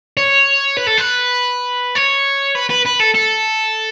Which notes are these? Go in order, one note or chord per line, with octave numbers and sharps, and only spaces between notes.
C#5
B4
A4
B4
C#5
B4
B4
B4
A4
A4